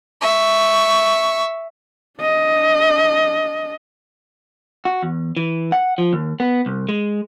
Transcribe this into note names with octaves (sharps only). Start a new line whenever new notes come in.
E5 C#6
D4 D#5
F#4
E2
E3
F#5
F3
D#2
B3
C2
G#3